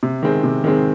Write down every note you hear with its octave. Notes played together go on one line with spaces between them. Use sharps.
C3
D#3 G#3 C4
C3
D#3 G#3 C4